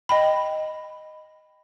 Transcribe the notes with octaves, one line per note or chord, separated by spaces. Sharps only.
D#5 G5 B5